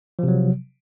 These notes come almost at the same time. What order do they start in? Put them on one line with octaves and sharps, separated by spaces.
F3 C3 F#3